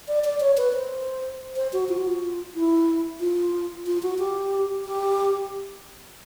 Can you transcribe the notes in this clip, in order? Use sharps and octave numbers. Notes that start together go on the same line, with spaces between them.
D5
D5
C#5
B4
C5
C5
F#4
F4
F#4
F4
E4
F4
F4
F#4
G4
G4